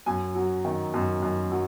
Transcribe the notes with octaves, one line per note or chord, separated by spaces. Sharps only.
F#2 G#5
F#3
D#3
F#2
F#2
F#3